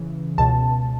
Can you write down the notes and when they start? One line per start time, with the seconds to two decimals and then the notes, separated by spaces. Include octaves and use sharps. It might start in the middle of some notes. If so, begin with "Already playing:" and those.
Already playing: C#3 E3
0.38 C#2 B2 A5